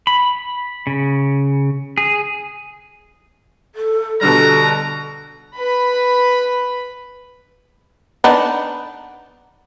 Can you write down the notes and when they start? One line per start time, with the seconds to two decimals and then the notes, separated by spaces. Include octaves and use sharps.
0.07 B5
0.87 C#3
1.98 G#4
3.75 A4
4.21 B2 D3 G3 A4 A#5
5.55 B4 B5
8.24 B3 D4 D#4